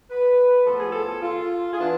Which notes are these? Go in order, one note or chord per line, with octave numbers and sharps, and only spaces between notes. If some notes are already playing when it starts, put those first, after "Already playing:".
B4
A2 F3 B3 A4
G#4
A4
F4
G#4
E3 B3 D4 F4